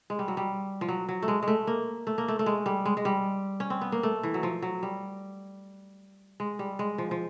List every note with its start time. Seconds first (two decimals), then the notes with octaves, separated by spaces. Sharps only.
0.10 G#3
0.19 G3
0.28 F#3
0.37 G3
0.81 F3
0.88 F#3
1.09 F#3
1.22 A3
1.28 G#3
1.43 G#3
1.48 A3
1.67 A#3
2.07 A3
2.18 A#3
2.28 A3
2.39 A3
2.46 G#3
2.66 G3
2.86 G#3
2.97 G#3
3.05 G3
3.60 C#4
3.70 C4
3.81 B3
3.92 A#3
4.03 A3
4.23 E3
4.34 F#3
4.43 F3
4.62 F#3
4.83 G3
6.40 G#3
6.59 G3
6.79 G#3
6.98 F3
7.11 F3